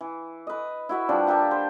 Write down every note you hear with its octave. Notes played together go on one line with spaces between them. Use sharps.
E3
B4 D#5
E4 F#4 E5
F3 G3 D4 B4
A#3 G4 E5 A5
C5